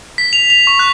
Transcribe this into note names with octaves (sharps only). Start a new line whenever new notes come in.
B6
F7
F7
C#6
F#6